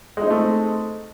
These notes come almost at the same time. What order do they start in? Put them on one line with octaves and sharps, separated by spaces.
G#3 D#4 C4 A3